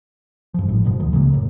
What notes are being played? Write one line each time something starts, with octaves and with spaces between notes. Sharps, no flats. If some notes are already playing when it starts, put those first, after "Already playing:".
G2 F3
G#1 A2
G1 B2 F3
D2 D#3
C#2 C#3 G#3 A#3
F1 A2